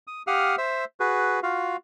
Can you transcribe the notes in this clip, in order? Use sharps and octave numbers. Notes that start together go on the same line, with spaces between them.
D#6
G4 F5 F#5 D#6 F6
C5 E5 E6
F#4 G#4 B4
F4 F#4 F5